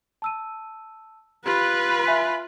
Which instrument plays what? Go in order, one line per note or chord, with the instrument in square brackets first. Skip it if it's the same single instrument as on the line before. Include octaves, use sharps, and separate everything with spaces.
[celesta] A5 E6 D#7
[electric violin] F4 B5 [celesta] G4 [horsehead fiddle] B4
[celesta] E5 G#5 B6